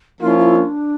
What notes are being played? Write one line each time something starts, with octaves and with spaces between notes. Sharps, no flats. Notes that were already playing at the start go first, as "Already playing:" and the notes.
F3 A#3 C#4 E4 F4
E4
D4